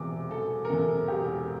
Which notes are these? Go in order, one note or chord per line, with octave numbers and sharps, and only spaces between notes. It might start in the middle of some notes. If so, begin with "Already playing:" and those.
Already playing: E1 E2 C3 D6
E1 A4
A#4
E2 C3 A4
E1 G4